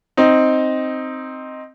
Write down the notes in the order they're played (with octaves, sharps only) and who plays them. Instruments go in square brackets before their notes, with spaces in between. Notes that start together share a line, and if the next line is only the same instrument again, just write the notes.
[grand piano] C4 D#4